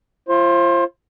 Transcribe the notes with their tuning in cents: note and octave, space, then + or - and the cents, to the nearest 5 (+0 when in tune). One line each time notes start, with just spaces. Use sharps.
F4 -30 C5 +30